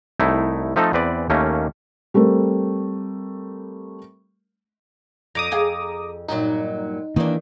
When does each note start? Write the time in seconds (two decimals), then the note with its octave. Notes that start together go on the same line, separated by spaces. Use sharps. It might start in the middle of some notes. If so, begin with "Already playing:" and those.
0.19 C2 A3 D#4 E4
0.76 F3 A3 C4 D#4 A4
0.93 E2 C4 B4 D5
1.30 D#2 A3 A#3 C#4
2.14 G3 A3 C4 A#4
5.35 F2 A#5 D6 D#6
5.51 F2 G#4 F5
6.28 G2 A#2 F#3 D#4
7.16 D#3 E3 A#3 D4